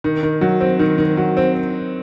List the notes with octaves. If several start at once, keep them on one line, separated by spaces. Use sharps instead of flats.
D#3
D#3
F#3
C4
D#3
D#3
F#3
C4